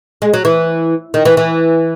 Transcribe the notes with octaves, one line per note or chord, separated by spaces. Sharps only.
G#3
F#3
E3
D#3
E3
E3